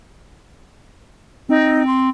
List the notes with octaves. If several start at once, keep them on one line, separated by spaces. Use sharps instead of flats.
C4 D#4
C6